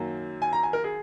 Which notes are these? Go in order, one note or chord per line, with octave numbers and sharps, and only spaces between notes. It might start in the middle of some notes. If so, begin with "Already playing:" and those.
Already playing: F#2 D#3 F#3 A#3
G#5
A#5
G#5
A#4
G#4